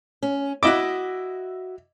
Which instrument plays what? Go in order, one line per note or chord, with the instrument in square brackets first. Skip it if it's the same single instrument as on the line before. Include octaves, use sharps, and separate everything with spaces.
[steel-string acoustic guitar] C#4
[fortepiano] E4 D#5 D6 [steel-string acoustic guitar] F#4 E5